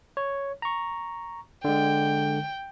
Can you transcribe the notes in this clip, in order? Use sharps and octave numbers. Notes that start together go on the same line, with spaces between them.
C#5
A#5 C#6
D3 G#3 G5